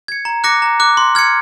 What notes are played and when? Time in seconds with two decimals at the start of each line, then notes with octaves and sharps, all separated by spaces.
0.08 G#6 C#7
0.25 A#5
0.44 D6 F#6 A#6 C#7
0.62 A#5
0.80 D6 F#6
0.97 C6
1.15 F6 G#6 C#7